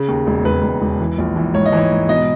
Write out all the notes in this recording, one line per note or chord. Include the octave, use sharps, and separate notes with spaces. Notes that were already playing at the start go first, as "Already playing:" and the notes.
Already playing: C#3
D#2
E1
E1 B4
E1
E1
E3
A#1
E3
G#2 C#5
D#5
E3
C#5
G#2
B2 D#5